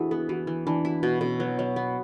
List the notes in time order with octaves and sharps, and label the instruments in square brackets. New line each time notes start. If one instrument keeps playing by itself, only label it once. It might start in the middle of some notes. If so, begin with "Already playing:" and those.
Already playing: [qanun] E3 A4 [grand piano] D4 E4 F#4 G#4
[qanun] B3 [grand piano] G#4
[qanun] E3 [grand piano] F#4
[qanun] E3
[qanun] E3 [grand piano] D4
[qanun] E4 [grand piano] F#4
[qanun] B2
[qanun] B2 [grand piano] C#4
[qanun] F#3 [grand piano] B4
[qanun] F#3 [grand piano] C#5
[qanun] B3